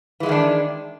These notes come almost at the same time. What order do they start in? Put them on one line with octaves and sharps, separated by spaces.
E3 G#3 E4 D#3 D4